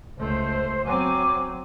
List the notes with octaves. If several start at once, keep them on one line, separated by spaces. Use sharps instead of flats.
C#2 A3 C5
F#3 C4 G#5 D6